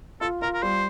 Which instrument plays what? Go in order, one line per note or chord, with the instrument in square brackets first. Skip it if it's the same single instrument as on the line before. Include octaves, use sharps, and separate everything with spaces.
[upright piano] F4 [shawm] A4
[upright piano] F4 [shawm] A#4
[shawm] A#4
[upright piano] G3 [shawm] C5